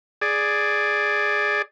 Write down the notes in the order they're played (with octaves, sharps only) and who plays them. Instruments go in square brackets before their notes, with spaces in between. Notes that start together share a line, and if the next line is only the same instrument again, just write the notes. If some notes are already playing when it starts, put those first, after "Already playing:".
[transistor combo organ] G#4 D5